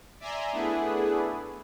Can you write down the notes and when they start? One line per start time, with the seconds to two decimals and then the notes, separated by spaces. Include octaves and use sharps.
0.20 D5 E5 G#5 A#5 C6
0.52 A3 B3 D4 E4 G#4 B4